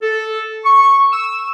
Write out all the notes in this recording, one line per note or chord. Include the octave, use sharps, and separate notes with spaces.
A4
C#6
E6